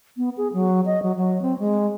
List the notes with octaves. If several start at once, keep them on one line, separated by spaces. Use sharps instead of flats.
B3
G#4
F#3
D#5
F#3
F#3
C4
G#3